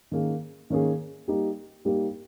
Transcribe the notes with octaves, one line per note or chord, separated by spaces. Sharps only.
D#3 A#3 C#4 G#4
D#3 A#3 C#4 G#4
G3 A#3 D#4 G4
G3 A#3 D#4 G4